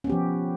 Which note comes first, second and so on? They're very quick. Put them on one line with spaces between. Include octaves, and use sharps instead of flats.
C#4 B3 G4 F3